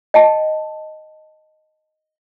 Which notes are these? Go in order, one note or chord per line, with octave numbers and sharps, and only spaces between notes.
D#5 G5 A5